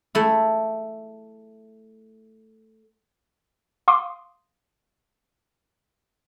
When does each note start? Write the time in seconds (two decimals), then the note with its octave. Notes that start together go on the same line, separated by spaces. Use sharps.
0.15 A3 E4
3.88 F5 C6 D6 D#6